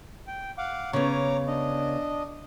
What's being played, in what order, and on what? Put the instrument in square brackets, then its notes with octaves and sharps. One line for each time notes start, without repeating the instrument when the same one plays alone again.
[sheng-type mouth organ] G5
F5 F#5 D6
[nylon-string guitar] C#3 B3 [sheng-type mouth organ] C#5 A#5 D6
[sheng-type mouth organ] D4 D#5